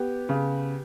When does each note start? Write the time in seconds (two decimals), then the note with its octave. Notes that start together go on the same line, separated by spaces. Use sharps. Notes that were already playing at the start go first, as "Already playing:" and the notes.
Already playing: B3 G4
0.29 C#3